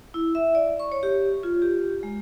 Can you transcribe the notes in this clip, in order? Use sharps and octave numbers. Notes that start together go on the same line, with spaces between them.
E4
E5
D5
C#6
C#5
G4
F4
G4
G#3